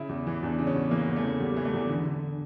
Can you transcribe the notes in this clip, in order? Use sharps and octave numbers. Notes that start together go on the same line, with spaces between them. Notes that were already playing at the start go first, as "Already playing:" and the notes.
Already playing: C#3 E4
E2
E3
E2 D4
C#3
C#4
E2
E3 A#3
E2
A3
C#3
E2 G3
E3
A3
E2
D3
D3